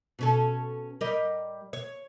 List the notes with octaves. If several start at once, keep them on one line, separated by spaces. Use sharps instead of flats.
B2 C#4 A4
G3 A#4 D#5
C#5